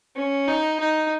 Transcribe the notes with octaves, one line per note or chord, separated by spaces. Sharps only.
C#4
D#4
D#4